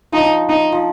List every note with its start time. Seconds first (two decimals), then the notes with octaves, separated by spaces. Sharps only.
0.12 F3 D#4
0.49 D#4
0.72 F3